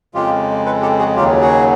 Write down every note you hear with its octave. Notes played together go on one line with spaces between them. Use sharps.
F2 C#3 F3 G#3 F4 G4
A4 B4
G4 A4
F#4 G#4
D#2 C#3 F#3 F4 G4
F#4 G#4